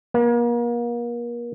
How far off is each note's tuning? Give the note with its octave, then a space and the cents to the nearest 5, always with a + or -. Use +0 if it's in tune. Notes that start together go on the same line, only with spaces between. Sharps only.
A#3 +35